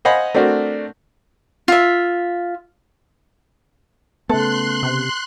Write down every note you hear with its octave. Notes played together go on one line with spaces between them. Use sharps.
C5 D#5 F5 F#5 G#5 B5
A3 C4 D4 F#4 A#4
F4 E5
C#3 A3 B3 A4 C6 F#6
C3